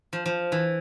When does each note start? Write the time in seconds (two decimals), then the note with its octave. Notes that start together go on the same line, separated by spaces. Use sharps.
0.13 F3
0.26 F3
0.52 E3